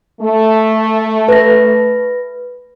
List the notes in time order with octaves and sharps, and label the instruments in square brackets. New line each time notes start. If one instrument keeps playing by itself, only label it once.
[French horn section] A3
[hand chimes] B4 A#6